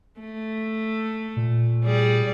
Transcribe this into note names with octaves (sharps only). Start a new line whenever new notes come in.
A3
A#2
G3 G#4 D5